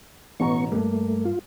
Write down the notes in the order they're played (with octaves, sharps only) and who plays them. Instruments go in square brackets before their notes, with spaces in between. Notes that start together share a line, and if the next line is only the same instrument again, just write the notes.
[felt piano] A1 B2 A#5 [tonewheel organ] B3 C#6
[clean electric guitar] E2 G2 [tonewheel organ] A3 [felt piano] A#3
[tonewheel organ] F4